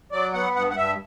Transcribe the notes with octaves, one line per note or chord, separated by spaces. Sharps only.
F#3 D5
B3 F#5
G2 F#5
F#5
G2 E5